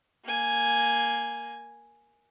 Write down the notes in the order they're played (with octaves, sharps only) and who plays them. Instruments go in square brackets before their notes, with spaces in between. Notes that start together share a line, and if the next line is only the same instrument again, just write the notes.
[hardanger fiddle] A#3 G#5